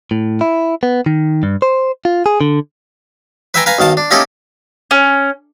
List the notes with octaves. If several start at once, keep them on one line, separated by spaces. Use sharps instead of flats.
A2
E4
B3
D#3
G2
C5
F4
G#4
D3
B4 C5 E5 G5 G#5 A#5
B4 F5 G#5 A#5
B1 D#3 F5 A5
D4
A#3 C#4 D#4 E4 G4 A4
C#4